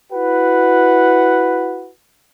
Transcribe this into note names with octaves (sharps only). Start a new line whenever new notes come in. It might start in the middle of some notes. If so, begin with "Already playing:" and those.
E4 F#4 B4 F#5